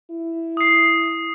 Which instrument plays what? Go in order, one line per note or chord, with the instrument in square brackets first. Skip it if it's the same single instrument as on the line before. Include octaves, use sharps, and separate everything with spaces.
[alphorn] E4
[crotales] D#6 C7